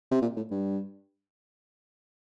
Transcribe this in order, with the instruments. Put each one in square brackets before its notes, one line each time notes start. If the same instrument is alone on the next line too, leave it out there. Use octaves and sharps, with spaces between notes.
[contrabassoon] C3
A#2
A2
G2